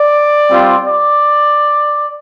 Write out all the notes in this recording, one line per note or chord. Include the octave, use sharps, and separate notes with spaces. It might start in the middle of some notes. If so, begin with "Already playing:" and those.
Already playing: D5
G3 C4 F4
D5